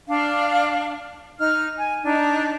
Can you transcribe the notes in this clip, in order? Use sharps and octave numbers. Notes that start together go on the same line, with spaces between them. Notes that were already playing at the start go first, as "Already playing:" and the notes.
D4 F5
D#4 F6
G#5
D4 D#4